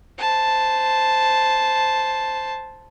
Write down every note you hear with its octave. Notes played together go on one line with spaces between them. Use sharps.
C5 A5